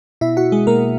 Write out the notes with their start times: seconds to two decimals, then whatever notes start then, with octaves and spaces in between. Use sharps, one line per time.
0.21 B2 E4 E5
0.37 F#4 F#5
0.52 G#3 G#4
0.67 B2 A#3 A#4